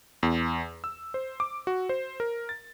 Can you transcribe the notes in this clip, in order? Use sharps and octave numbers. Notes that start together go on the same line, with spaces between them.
E2
E6
C5
D6
F#4
C5
A#4
A6